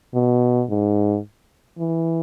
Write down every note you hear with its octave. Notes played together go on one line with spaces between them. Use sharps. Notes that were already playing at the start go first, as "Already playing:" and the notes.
B2
G#2
E3